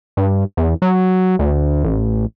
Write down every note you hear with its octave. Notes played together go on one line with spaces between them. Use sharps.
G2
E2
F#3
D2
A1